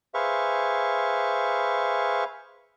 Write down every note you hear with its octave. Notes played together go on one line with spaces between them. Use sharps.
G#4 B4 C5 E5 F5 C#6